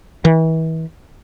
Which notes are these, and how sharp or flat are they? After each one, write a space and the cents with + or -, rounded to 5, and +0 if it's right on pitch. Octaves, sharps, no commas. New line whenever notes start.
E3 -35